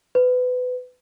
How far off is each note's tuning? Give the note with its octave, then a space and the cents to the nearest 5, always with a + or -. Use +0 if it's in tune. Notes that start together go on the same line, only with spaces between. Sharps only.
B4 +25